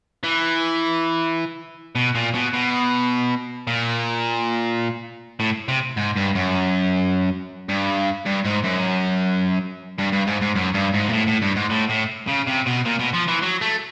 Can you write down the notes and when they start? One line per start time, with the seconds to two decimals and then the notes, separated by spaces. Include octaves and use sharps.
0.24 E3
1.95 B2
2.15 A#2
2.34 B2
2.53 B2
3.67 A#2
5.40 A2
5.68 C3
5.97 G#2
6.16 G2
6.35 F#2
7.69 G2
8.26 G2
8.46 G#2
8.64 F#2
9.98 G2
10.12 G2
10.27 G#2
10.41 G#2
10.56 F#2
10.74 G2
10.94 G#2
11.08 A#2
11.13 A2
11.27 A2
11.42 G2
11.56 G#2
11.70 A2
11.89 A2
12.27 C#3
12.47 C3
12.66 B2
12.85 A#2
12.99 B2
13.14 F3
13.28 E3
13.42 F#3
13.61 A3